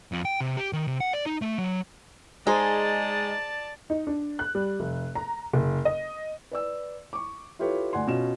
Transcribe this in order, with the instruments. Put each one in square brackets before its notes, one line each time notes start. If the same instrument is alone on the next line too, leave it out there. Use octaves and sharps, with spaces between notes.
[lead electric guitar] F2
G5
C3
G4
D#3
C3
F#5
D5
D#4
A3
F#3
[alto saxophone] G#3 [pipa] D#4 [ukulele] G#4 C5 [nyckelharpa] D5 A5
[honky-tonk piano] D#4
D4
F#6
G3
F1
A#5
F#1
D#5
[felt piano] B4 D5 E6
C#6 D6
E4 F4 G4 A4 B4 C#5
D2 D5 F#5 G#5 C6
B2 C#4 F4 E7